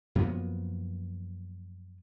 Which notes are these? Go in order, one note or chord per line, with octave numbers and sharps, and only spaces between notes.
F#2 F3 A#3 B3